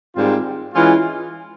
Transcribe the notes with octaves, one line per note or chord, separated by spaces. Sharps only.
G#2 D#3 G3 C4 F4
E3 G#3 C#4 F4